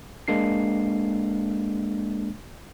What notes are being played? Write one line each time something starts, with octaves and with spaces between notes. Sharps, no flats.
G#3 A#3 D4 C7